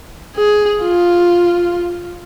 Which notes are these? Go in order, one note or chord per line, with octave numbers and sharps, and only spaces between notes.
G#4
F4